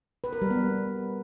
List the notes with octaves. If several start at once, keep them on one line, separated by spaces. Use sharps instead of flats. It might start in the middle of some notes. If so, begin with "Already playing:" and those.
B4
A#4
G3
B3